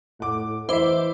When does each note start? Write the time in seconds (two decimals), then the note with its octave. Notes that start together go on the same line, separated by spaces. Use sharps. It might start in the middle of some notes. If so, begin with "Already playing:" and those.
0.20 A2 F#5 D6
0.69 E3 E4 C5 E5 D6